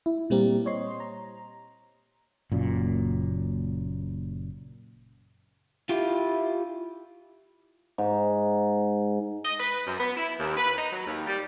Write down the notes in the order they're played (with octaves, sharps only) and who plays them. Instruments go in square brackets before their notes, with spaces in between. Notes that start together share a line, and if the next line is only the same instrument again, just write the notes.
[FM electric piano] E4
A#2 G3 A#3 C4 G4 A#4
C5 C#5 D#5 C6
A#5
[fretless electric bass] F#1 F#2 A#2
[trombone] E4 [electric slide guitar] F4 G4
[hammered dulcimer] G#2
[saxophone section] D#5
B4
F#2
B3
E4
D#2
B4
D#4
F#3
D#2
G3